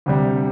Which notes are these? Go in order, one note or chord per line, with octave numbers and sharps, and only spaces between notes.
D2 C3 G3